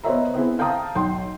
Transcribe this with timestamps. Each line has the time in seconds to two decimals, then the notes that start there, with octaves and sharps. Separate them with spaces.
0.04 B3 C5 C#5 D#5 E5 A#5
0.34 B3 C4 E4 G#4
0.59 F5 G5 A5 A#5 D#6
0.95 B1 G5 C6